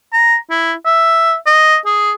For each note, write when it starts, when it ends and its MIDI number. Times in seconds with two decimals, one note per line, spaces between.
0.13 0.36 82
0.50 0.74 64
0.86 1.35 76
1.46 1.77 75
1.86 2.12 68